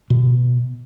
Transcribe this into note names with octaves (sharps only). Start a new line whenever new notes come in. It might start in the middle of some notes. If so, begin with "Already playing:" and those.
B2